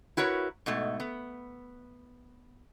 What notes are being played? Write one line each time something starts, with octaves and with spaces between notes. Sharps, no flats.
E4 F#4 A#4 B4 C#5
G#2 B2 A3
B3